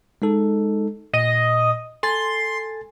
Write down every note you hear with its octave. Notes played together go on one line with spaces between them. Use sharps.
G#3 D#4 A4
A#2 D#5
A4 G#5 C6 A6